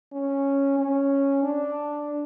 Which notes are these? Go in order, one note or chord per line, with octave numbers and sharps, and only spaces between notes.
C#4
C#4
D4